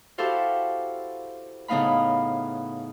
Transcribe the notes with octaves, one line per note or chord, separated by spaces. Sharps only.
E4 F#4 G4 A4 C5 F5
A2 C#3 B3 D#4 F5 B5